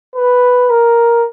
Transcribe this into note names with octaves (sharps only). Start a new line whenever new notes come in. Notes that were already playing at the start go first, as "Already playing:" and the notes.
B4
A#4